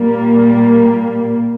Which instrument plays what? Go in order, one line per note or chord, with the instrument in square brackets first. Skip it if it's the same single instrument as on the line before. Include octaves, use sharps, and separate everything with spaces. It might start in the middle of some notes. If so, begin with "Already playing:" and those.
Already playing: [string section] A#2 G3 A#3